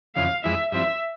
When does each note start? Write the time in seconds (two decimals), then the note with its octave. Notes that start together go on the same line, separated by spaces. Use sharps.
0.15 F2 C#3 E3 F5
0.44 F2 E3 G#3 E4 E5
0.72 G2 F3 C4 E4 E5